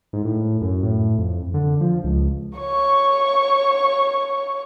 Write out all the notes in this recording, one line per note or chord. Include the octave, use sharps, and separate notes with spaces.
G#2
A2
F#2
A2
F2
D3
F3
C#2
C#5 C#6